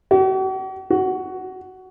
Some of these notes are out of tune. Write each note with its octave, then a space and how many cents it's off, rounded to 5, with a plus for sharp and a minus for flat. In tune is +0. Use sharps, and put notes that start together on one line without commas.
F#4 +45
F#4 +15